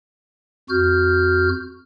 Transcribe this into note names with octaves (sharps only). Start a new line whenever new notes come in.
F2 F#4 F6 G6